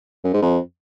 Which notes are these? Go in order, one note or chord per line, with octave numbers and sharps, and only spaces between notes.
F#2
G#2
F2